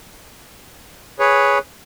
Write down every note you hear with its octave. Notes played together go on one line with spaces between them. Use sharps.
G#4 B4 C#5